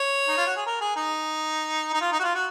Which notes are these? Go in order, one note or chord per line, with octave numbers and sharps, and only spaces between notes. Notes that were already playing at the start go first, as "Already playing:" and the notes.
Already playing: C#5
D#4
F4
F#4
G#4
A#4
G#4
D#4
D#4
F4
D#4
F#4
F4
F#4